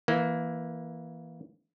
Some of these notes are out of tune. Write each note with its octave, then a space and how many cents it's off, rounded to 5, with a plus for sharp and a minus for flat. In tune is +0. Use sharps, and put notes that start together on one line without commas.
E3 +0 A#3 +15